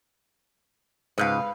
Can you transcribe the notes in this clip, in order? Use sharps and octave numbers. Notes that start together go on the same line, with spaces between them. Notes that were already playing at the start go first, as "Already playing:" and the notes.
C#2 G#2 B4 D5 F5